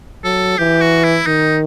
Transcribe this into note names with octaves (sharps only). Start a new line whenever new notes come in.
F#3 A4
E3 G4
F#4
E4
D#3 D#4